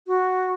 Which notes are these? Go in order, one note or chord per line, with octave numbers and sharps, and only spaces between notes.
F#4